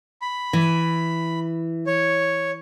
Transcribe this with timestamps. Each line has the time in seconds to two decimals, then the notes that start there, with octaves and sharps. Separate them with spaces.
0.22 B5
0.53 E3
1.87 C#5